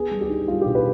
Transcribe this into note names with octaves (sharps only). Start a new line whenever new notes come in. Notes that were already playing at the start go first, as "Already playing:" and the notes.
Already playing: B3 G#4
G3
G4
D#4
G3 F4
B2 G4
B4